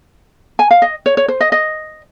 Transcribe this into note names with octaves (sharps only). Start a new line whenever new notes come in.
G#5
F5
D#5
C#5
C#5
C5
D#5
D#5